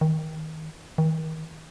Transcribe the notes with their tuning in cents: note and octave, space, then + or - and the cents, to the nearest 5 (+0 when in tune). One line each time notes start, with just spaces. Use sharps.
D#3 +20
D#3 +35